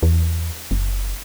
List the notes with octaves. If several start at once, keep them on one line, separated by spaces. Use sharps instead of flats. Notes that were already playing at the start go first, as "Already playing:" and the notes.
E2
F#1